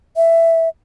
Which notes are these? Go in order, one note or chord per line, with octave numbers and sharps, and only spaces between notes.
E5